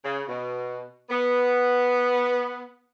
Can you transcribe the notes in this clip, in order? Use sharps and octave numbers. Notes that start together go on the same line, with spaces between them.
C#3
B2
B3